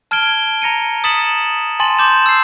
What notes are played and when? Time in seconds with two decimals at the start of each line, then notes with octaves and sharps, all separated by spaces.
0.11 A5 F6 G#6 D7 G7
0.62 A#5 A#6 C#7 D#7
1.04 D#6 A6 B6 C#7 E7 F#7
1.80 G#5 A5 C6 A6 F#7
1.99 C6 D6 G6 E7
2.26 E6 C7